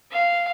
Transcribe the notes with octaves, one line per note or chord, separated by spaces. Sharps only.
F5